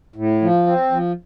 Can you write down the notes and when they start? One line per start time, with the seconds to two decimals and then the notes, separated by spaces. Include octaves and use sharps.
0.16 A2
0.42 F3
0.66 C4
0.91 F3